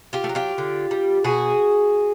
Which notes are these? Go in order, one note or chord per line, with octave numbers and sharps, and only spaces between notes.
F4 G4
A3
F#3
F4 G4
D3
G3
B2 F#4 G#4